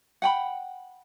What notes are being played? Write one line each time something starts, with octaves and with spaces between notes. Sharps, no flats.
F#5 G5 B5